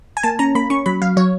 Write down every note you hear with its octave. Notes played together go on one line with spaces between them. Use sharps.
G#5
A#3 A5
C#4 A#5
A#3 B5
C#4 C#6
F#3 B5
F#3 F5
F#3 C#5